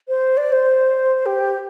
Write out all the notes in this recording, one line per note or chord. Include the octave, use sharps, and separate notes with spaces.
C5
D5
C5
G4